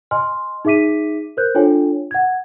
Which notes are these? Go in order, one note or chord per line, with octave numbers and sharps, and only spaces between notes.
D#5 G#5 C6 F6
D#4 G#4 E5 D6 B6 D#7
A#4 C5 F#6 G6
D4 F4 A4 C#5 G5 G#5
F#5 G#6